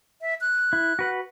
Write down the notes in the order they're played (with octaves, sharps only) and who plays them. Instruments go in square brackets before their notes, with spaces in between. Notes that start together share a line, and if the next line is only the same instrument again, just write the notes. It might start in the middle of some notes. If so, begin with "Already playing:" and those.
[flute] E5
F#6
[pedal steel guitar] E4
F#4 B4 F#5